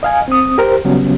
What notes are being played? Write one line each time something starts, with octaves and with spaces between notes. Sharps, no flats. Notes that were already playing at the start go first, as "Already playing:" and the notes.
D#5 F5 G#5
C4 D#6
G4 A#4 C5
C#3 F#3 G3 B3 C#4